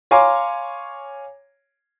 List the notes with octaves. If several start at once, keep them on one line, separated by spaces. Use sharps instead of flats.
C#5 F5 G#5 A#5 C6 D6